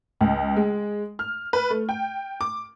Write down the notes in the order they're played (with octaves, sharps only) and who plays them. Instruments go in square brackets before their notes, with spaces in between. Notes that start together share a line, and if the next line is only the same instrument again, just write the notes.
[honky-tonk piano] C#2
G#3
F6
B4
A3
G5
D6